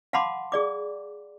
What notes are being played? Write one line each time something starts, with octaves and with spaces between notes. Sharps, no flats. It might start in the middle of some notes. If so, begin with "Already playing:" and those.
F5 F#5 A5 B5 C6 D6
G#4 D5 D6